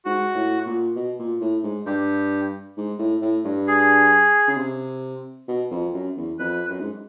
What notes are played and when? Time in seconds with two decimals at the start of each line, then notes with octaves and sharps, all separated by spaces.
0.05 G#2 F#4
0.35 A2
0.66 A#2
0.96 B2
1.19 A#2
1.41 A2
1.64 G#2
1.86 G2 G4
2.77 G#2
2.99 A2
3.22 A2
3.45 G2
3.68 G#4
4.48 C#3
4.57 C3
5.48 B2
5.71 F2
5.94 F#2
6.17 E2
6.39 F2 B4
6.70 F#2
6.80 G#2